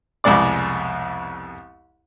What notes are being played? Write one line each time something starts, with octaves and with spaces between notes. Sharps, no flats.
C2 F2 B2 G#3 D5 D6